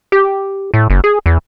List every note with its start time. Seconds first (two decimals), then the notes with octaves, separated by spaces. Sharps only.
0.12 G4
0.74 A2
0.90 F#1
1.04 G#4
1.26 E2